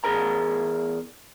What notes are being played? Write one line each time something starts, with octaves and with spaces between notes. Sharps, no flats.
E2 G#4 A#4 A#5